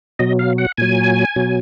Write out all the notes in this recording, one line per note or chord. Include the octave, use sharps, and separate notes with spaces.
B2 F#3 D#5
F5
F#5
A#2 F#3 G#5
B2 F#3